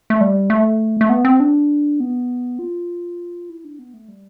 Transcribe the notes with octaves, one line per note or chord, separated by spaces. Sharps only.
A3
G3
A3
A3
B3
C4
D4
B3
F4
E4
D4
B3
A3
G3